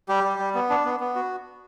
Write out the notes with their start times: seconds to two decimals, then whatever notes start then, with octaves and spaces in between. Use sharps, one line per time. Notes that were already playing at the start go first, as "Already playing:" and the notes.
0.09 G3 G4
0.24 G3
0.39 G3
0.55 B3
0.70 D4
0.85 B3
1.00 B3
1.15 F#4